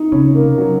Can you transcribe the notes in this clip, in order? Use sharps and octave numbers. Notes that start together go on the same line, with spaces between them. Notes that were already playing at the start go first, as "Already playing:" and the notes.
Already playing: D#4
C#3 C#4
A#3
C3
F#3